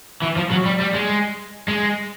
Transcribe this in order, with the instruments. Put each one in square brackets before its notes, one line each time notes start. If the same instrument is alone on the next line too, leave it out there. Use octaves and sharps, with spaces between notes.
[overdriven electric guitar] E3
F3
F#3
G3
G3
G#3
G#3